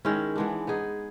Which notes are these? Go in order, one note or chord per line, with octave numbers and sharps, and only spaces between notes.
D#3 G#3 C#4 E4
E3 G#3 B3 D4
B3 D#4 G#4